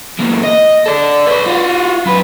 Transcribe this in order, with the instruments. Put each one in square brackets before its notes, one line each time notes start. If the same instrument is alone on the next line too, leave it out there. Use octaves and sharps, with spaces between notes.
[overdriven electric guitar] A#2 E3
D#5
A4 D5
B4 C#5
F4 F#4
F#2 B4